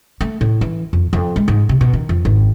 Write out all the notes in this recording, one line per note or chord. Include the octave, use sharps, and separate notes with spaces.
A3
A2
E3
F2
F2
G#3
G#2
C3
B2
D#3
F2
G#1